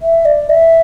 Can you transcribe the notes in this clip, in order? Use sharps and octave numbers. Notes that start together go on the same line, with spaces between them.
E5
D5
E5